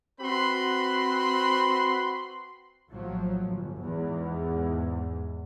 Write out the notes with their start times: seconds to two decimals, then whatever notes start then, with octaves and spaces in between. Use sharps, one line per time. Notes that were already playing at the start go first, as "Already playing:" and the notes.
0.21 C4 F#4 B4 B5 C6
2.91 A#1 A2 F3 F#3
3.45 G1
3.82 E2 G#2